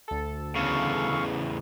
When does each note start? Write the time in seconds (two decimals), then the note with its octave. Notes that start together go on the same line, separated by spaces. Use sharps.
0.08 D2 A4
0.56 E2 C#3 F5 C#6